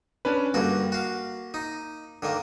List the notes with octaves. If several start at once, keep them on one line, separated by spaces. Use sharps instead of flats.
C#4 D4 B4
G2 D3 A#3 F#4
F#4 F5
D#4
D3 D#3 A#3